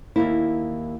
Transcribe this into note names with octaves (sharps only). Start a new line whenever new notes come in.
D#2 G#2 A#3 E4